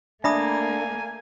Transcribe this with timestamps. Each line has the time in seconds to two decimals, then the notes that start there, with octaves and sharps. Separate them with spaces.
0.24 A3 A#3 D4 E5 G#5 B5 D#6